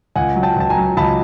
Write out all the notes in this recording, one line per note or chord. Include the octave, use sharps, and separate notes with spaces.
C#2 F#5 G#5
F#3
G5 A5
C#2 A5
G#5 A#5
F#3
C#2 A5 B5